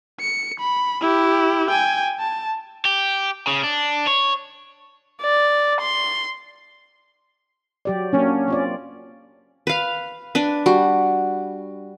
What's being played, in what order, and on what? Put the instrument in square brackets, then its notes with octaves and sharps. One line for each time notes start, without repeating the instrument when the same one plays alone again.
[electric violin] C#7
B5
E4 G4
G5 G#5
A5
[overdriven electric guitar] G4
C#3
D4
C#5
[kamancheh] D5
C6
[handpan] F#3 G4 D5
[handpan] F#3 A#3 D4 [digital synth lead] C#4
[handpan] C4 F4 D5
[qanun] B4 F5
D4 B4
G3 F#4